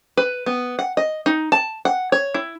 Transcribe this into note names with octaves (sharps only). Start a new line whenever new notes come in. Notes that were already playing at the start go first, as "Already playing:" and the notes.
B4
B3
F#5
D#5
D#4
A5
F#5
C#5
E4